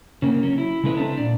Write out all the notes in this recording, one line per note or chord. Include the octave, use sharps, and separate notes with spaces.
C#3 A#3
F#3 C#4
E4
C#3 G#3 E4 A4 B4 D#5
C4 D4 E5 A5 A#5
A#2 D5